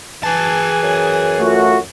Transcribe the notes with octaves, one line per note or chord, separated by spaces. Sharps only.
E3 G#4 A5
F#2
A3 F4 F#4